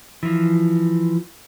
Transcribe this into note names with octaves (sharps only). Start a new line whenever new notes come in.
E3 F3